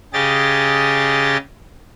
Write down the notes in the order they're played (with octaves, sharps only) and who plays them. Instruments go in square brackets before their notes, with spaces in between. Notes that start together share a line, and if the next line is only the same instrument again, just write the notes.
[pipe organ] C#3 G4 G#4 D#5 A6